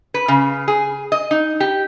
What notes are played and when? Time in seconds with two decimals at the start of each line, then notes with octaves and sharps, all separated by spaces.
0.14 B4
0.28 C#3
0.68 G#4
1.12 D#5
1.31 D#4
1.60 G4